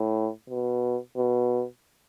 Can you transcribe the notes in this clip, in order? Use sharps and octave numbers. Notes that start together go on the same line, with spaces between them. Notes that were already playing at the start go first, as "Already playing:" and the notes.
Already playing: A2
B2
B2